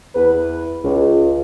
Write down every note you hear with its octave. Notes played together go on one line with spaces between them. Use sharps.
E2 B4
C#2